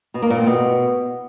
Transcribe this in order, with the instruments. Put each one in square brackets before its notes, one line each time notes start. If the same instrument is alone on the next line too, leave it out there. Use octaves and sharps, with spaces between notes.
[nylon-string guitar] B2
A#3
A#2
C4
B2